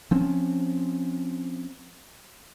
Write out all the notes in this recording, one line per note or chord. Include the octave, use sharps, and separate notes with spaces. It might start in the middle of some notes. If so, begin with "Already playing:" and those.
F3 C4 C#4